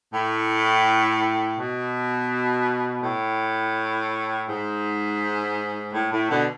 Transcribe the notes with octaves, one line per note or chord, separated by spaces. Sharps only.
A2
B2
A2
G#2
A2
A2
B2 D3